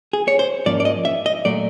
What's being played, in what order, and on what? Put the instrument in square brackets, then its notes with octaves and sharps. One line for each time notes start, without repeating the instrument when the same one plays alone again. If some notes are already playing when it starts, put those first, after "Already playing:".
[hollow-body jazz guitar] G#4
C#5
C5
G#2 F3 A#3 C#4 D5
D5
D#5
E5
D#5
A#2 F#3 A3 D5